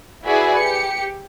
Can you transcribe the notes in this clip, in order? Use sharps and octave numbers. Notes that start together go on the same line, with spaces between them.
E4 F#4 G#4 B4 D5 E5
G4 C#7